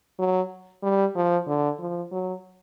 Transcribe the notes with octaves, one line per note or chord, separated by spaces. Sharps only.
F#3
G3
F3
D3
F3
F#3